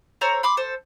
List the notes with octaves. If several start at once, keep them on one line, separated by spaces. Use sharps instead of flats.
A4 C5 C#5 A#5
B5 C6 D6
A4 C5